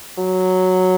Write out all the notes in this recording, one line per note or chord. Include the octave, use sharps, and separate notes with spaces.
F#3